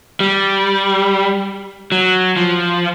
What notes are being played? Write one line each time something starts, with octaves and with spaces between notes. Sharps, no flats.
G3
F#3
F3